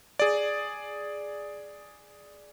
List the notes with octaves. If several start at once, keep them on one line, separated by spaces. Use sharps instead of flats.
G#4 D5